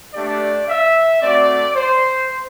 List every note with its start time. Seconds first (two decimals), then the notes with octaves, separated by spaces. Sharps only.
0.14 A3 D4 G4 D5
0.68 E5
1.21 A3 C4 F#4 D5
1.74 C5